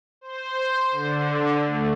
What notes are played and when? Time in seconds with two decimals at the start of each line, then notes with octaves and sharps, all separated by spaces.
0.21 C5
0.91 D3
1.63 A3